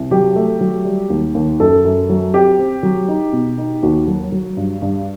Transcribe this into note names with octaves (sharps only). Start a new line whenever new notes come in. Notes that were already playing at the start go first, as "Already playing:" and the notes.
Already playing: C2
F#3 G4
A3
F#3
G3
D#2
D#2
F#2 A4
F#2
F#3
C4 G4
C4
F#3
D#4
B2
D#4
D#2 F#4
F#3
F#3
G2
G2